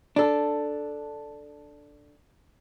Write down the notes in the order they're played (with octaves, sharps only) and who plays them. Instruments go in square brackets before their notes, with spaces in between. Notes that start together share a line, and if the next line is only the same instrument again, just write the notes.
[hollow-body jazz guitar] D4 A4